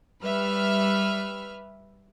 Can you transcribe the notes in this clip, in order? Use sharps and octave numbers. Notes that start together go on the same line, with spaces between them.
G3 B4 E5 F6